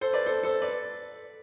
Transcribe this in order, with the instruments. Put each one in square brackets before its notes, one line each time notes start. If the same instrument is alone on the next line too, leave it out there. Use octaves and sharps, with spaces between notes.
[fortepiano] A4 C5
B4 D5
A4 C5
A4 C5
B4 D5